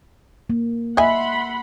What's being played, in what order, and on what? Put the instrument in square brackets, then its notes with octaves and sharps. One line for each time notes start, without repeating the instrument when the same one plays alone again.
[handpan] A#3
[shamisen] D#5 G#5 [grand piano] E5 [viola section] F#5 B5 C6